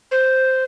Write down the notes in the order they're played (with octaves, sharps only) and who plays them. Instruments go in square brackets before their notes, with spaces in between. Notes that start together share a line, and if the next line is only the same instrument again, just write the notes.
[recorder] C5